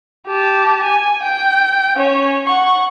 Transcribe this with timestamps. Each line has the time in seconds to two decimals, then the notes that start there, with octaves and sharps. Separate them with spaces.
0.27 G4 A5
0.83 G#5
1.23 G5
1.97 C#4 C#5
2.45 F#5 C#6